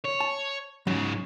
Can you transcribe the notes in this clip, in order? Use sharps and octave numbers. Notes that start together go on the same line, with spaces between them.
C#5
A5
G#2 C#3 F#3